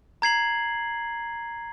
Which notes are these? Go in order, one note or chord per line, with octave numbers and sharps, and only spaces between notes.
A#5 G#6 C7 F#7